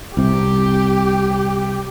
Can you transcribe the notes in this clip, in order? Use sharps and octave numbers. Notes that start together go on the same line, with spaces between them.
C2 C3 G4